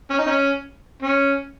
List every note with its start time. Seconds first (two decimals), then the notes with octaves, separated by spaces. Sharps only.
0.10 C#4
0.19 D#4
0.27 C#4
1.02 C#4